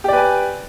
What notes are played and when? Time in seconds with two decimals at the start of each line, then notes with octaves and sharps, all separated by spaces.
0.04 G4
0.08 D5
0.13 B4
0.17 G#5